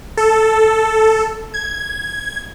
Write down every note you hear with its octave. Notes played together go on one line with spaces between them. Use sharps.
A4
G#6